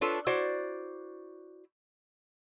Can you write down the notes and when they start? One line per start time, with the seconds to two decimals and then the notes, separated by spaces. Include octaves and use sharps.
0.01 D4 F4 A4 B4 C#5
0.27 E4 F#4 C5 D5